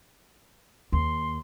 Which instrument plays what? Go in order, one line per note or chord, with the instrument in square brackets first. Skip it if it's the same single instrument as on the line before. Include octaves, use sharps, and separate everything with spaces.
[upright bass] D#2 [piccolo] C6